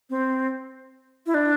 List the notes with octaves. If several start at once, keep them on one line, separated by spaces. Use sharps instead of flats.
C4
E4
D4